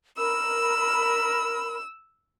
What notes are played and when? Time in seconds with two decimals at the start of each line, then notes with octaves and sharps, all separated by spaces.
0.18 A#4 B5 E6